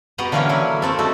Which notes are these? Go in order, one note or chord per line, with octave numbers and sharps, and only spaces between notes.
B3 F#4 G4 D#5 F#5 A#5
D3 E3 A#3 C#4 C#5
F#3 E4
A3 C4 A4
A3 D#4 F#4 A4